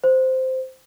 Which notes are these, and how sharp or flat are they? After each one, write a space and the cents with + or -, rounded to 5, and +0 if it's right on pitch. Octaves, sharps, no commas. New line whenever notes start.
C5 -10